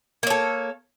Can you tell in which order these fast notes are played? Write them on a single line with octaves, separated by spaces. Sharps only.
A#3 C#5 A4